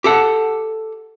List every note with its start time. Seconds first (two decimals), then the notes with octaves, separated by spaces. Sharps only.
0.04 G4 A4 F#5